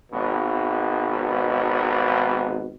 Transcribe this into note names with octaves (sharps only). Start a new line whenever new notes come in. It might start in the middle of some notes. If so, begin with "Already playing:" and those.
G#1 B2